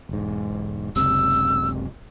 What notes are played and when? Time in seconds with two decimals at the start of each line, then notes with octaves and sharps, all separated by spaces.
0.09 E1 G#2
0.96 F#1 C#2 C3 E6